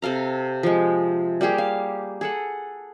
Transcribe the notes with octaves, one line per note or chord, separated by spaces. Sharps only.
C3 A4 F5 A#5
F3 G#3
G3 A#3 G4 G#4
F5
G#4 A4 F#5